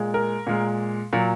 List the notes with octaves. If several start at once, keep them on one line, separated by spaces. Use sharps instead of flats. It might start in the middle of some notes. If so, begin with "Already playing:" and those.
Already playing: A#2 G#3
A#4
A#2 G#3
A#2 F#3